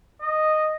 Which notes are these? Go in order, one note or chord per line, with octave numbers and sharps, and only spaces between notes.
D#5